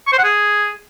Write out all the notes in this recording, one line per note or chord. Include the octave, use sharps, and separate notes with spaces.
C#6
C5
F#5
G#4